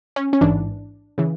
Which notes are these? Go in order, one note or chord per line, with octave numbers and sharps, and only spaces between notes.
C#4
C#4
A1 G#2 E3 D4
C#3 E3